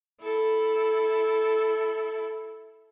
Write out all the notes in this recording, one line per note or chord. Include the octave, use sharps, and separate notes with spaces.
E4 A4